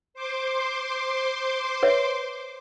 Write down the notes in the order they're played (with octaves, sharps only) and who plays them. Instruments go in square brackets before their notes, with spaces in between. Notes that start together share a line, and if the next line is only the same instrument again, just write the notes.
[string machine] C5 C6 D6
[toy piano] B4 C#5 E5